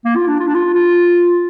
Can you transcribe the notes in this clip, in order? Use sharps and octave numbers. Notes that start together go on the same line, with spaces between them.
A#3
F4
D4
F4
D4
F4
F4